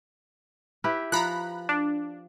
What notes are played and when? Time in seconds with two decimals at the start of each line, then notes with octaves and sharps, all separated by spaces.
0.84 E4 G4 B4
1.12 F3 A#5 B5 F#6
1.69 D4